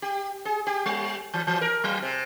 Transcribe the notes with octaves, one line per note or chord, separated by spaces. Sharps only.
G4
G#4
G4
G3
E3
E3
A#4
F#3
C3